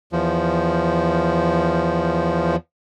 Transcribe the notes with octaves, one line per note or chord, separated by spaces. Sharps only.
E2 F3